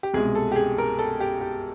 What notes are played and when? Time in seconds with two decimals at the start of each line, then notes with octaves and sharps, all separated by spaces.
0.03 G4
0.14 C2 B2 G#3 G#4
0.35 A4
0.52 G4
0.56 G#4
0.78 A#4
0.99 A4
1.20 G4
1.41 G4